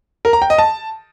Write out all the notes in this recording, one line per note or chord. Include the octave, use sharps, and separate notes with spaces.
A#4
A#5
G5
D#5
A5